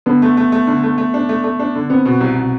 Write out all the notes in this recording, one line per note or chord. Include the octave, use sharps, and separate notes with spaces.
D3 B3
A3
A3
A3
D3
A3
A3
D4
A3
A3
D4
D3
B3 C4
B2
C2
B2